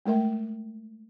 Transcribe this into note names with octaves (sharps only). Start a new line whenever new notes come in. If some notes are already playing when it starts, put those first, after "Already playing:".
G#3 A3 A#4 E5